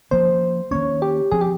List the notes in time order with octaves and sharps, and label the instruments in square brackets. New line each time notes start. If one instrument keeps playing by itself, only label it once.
[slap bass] F3 A#3 C#4 [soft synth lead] C5
[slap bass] D#3 A#3 C#4 [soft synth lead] C#5
[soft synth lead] G4
[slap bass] F3 C4 [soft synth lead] G#4
[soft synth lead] G4